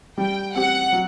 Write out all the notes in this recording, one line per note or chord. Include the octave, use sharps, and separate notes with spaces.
G3 G5
C4 G4 F#5
F#3